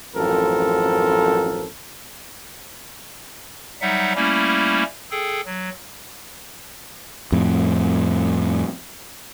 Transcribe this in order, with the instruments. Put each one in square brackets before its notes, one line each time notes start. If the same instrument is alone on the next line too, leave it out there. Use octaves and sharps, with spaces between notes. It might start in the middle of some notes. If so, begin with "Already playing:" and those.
[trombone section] A1 F#2 F3 C4 A4 A#4
[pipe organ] F#3 G3 D#4 E5 F#5
G3 A3 A#3 C#4 E4
G#4 A4 G5
F#3
[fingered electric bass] F2 A2